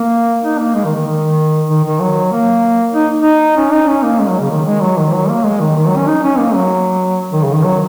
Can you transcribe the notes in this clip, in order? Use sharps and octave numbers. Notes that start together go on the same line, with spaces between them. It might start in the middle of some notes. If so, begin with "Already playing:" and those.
Already playing: A#3
D#4
A#3
G#3
D#3
D#3
D#3
D#3
D#3
F#3
A#3
D#4
D#4
C#4
D#4
C#4
A#3
G#3
F#3
C#3
D#3
G#3
F#3
D#3
F#3
A#3
G#3
D#3
D#3
F#3
C#4
D#4
C#4
A#3
F#3
D#3
C#3
D#3
F#3